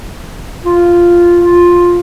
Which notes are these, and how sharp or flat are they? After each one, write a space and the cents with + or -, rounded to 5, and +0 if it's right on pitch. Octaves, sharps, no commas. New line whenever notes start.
F4 -5
F4 +5